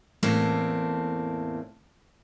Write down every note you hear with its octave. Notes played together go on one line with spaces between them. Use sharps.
E2 A2 A#3 C4 A4